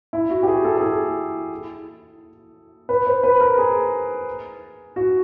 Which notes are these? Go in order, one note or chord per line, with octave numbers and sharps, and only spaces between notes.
E4
F#4
G4
G#4
A4
G#4
A4
B4
C5
B4
A#4
G#4
F#4